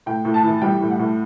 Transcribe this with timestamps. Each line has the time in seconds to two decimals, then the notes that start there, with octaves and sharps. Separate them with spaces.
0.06 A2 G5
0.25 A2
0.34 A5
0.44 E3
0.62 G3 G5
0.81 A2
0.90 F#5
0.99 A2